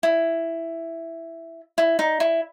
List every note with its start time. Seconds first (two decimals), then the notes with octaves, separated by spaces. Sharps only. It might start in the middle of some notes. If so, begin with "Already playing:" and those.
0.03 E4
1.78 E4
1.99 D#4
2.20 E4